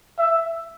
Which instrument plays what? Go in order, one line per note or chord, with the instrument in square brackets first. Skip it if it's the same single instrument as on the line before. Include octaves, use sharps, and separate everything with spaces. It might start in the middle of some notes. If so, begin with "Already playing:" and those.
[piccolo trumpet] E5